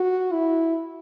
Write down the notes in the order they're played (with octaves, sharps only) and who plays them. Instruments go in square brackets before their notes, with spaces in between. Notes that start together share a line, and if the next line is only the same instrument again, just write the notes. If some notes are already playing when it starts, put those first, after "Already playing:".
Already playing: [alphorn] F#4
E4